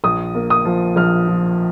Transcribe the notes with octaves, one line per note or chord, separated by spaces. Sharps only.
A#1 D#6
A#3
D#6
F3
A#1 F6
F3